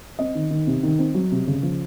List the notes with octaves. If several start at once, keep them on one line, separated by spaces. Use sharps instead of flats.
C4 D#5
D#3
D#3
C3
D#3
C4
F#3
C3
C#3
F3